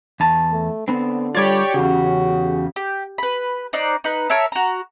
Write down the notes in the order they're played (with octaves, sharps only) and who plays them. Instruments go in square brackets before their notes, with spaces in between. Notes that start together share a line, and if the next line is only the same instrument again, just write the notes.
[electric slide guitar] E2 A5
[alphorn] A3
[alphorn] D3 [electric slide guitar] B3 C4
[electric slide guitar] G3 F4 [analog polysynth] G4 C#5 D5
[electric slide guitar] E2 G4 [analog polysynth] C#3 [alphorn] F#4
[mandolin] G4
B4 B5
D#4 C5 D5 F#6
D#4 B4
A#4 C#5 E5 A5
F#4 A#5